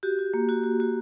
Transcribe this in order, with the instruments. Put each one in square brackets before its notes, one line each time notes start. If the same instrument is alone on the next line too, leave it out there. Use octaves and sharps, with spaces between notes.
[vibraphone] F#4 G4
F#4
A#3
F#4
F#4
F#4